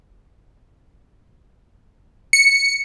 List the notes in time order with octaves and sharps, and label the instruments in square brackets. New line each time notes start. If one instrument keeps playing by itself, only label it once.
[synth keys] C#7